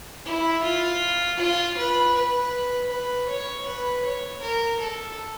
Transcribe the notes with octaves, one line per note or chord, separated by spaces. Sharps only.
E4
F4
F4
B4
B4
B4
C#5
B4
C#5
A#4
A4